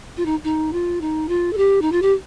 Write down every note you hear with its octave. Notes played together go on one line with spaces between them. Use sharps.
F4
D#4
D#4
F4
D#4
F4
A4
G4
D#4
F4
G4